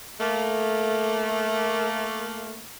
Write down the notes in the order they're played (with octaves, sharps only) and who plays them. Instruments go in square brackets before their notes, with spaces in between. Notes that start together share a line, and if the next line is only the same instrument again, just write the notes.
[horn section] A3 A#3